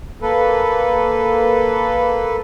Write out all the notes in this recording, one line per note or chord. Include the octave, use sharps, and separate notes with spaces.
A#3 A4 B4